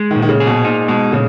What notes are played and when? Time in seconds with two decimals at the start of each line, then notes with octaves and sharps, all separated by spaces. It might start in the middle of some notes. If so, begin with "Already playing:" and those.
Already playing: G#3
0.11 D#3
0.16 A#2
0.22 D#3
0.29 C#3
0.40 G#4
0.46 B2
0.64 A#2 D#4
0.88 B2 G#3
1.12 A#2 C#3